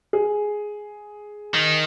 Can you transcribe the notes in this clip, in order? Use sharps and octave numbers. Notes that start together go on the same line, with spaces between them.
G#4
D#3